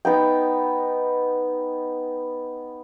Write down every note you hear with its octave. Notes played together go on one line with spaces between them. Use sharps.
B3 D#4 G5